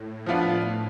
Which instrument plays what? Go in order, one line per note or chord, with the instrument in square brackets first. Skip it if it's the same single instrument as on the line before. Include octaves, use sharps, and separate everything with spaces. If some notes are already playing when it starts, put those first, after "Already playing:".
Already playing: [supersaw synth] A2
[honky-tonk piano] F3 B3 D4 F4